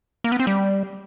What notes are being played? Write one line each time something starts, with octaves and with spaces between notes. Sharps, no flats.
A#3
B3
C4
G3